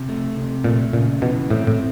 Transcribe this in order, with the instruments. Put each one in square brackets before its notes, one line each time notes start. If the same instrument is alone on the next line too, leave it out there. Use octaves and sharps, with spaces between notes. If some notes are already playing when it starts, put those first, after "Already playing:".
Already playing: [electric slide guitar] C3
A3
C3
[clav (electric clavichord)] A#2 [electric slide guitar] A3
[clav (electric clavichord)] A#2 [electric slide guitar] C#3
[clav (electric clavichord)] B2 [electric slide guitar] E3
[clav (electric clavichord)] A2 [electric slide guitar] C4
[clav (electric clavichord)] A2